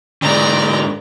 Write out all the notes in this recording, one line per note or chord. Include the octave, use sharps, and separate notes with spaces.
G#2 D3 D5 A#5